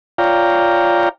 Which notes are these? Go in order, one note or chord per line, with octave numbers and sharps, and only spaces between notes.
F4 C#5 D5 F5 G5 A#5